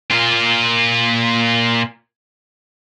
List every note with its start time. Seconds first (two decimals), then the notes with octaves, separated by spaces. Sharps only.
0.11 A#2 F4